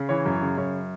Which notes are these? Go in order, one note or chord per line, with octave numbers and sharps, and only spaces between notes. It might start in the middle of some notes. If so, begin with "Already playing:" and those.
Already playing: C#3
E3 C#5
F#2
C#3
F#2 C#5